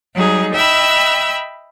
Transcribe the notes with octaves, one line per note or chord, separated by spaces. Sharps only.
F#3 G3 D#4 G#4
D#5 E5 G5 B5 E6